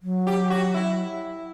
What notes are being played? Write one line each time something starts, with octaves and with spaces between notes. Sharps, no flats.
F#3
G4
F#4
E4